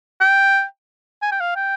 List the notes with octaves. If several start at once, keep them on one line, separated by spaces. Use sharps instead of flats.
G5
G#5
G5
F5
G5